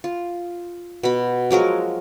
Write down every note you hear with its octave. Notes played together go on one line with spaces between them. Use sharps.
F4
B2 B5
F3 F#3 G#3 A#4